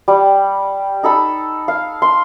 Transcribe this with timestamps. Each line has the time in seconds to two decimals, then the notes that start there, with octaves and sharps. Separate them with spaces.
0.08 G3
1.03 D#4 A4 B5
1.68 F5
2.02 C6